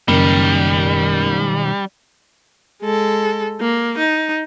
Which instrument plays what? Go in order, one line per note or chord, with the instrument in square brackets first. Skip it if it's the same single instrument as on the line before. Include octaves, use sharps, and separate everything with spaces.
[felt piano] F#1 [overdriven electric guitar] B1 D#3 [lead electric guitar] G3
[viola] G#3 A4
A#3
D#4